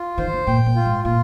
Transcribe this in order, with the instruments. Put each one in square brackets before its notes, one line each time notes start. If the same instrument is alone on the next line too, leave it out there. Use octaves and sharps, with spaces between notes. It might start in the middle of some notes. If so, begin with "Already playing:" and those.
Already playing: [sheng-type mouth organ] F4
[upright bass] D#3 [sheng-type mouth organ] C5
[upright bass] D3
[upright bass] A#2 [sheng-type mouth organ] G5
[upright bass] A#2
[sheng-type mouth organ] F4
[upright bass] G#2
[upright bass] A#2 [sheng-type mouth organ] F4